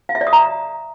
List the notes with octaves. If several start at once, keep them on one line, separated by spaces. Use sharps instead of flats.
F5
E5
D5
D#6
A#5